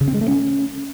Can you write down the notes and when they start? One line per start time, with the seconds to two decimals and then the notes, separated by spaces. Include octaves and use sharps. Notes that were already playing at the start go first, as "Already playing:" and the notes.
0.01 C#3
0.08 C4
0.14 G#3
0.21 A3
0.28 C#4